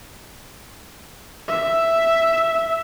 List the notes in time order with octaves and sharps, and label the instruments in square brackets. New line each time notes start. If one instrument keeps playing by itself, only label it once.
[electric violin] E5